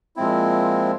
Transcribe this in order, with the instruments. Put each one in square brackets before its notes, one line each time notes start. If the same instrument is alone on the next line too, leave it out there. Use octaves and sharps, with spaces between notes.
[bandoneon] A#2 F3 G#3 C4 E4